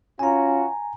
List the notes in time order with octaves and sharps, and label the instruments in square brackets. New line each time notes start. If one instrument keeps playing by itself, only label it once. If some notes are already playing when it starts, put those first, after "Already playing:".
[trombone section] C#4 F4 F#4 [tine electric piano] G#5 A#5